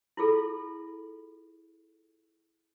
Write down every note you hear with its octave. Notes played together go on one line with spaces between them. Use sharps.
E4 F4 G#4 A4